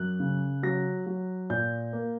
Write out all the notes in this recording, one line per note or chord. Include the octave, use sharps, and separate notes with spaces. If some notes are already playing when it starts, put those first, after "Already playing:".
Already playing: F#2 F#6
C#3
F#3 A#6
F#3
A#2 G6
A#3